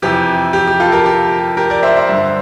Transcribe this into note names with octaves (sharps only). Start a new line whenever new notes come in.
F2 C3 E3 G4
G4
G4
F4 A4
G4 A#4
G4
G4 A#4
A#4 D5
C5 E5
C5 E5
G2 D3